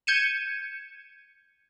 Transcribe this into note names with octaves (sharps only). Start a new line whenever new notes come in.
G6 G#6 C#7 D#7 E7